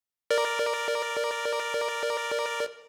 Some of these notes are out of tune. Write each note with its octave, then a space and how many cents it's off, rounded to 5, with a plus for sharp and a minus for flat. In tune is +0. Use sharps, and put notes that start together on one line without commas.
A#4 +0 D5 +0